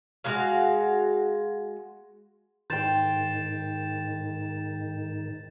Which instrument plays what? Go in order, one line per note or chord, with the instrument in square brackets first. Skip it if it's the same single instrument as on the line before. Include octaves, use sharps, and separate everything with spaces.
[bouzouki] G#3 F#4 F5
[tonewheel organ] G#2 D#3 [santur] C5 G5 [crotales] G6 A6 E7